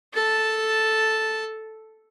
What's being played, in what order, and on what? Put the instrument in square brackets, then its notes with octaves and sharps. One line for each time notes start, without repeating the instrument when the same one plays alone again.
[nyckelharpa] A4 A5